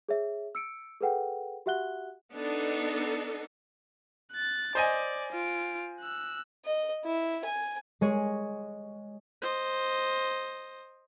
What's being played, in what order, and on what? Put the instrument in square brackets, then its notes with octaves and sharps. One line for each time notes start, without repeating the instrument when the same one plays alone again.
[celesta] G#4 C#5 E5
E6 C#7 D7
G#4 A4 B4 F#5 G5
F#4 G4 E5 F#5 F#6 G7
[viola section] B3 D4 D#4 A4
[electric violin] F#6 A6
[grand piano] C5 D#5 G#5 [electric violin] D5
[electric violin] F4 D7
E6 F#6
[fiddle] D#5
E4
G#5
[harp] G#3 G#4 C#5
[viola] C5 D#5